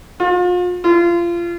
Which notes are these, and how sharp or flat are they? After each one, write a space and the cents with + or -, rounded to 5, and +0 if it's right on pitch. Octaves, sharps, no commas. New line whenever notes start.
F4 +40
F4 -25